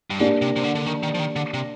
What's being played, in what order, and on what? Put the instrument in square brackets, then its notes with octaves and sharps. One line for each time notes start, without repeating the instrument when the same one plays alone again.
[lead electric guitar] G2
[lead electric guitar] G#2 [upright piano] A#3 D4 G4 D5
[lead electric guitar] C3
C3
D3
D3
D#3
D#3
F3
D#3
D3
C3